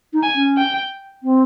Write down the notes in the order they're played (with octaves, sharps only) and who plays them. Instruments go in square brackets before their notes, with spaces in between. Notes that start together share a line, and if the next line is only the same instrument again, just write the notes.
[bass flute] D#4
[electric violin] G#5
[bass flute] C#4
[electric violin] G5
[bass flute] C4